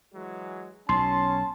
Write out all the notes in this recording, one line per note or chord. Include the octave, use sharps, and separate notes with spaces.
E3 F#3 G#3
B1 C#4 A5 C6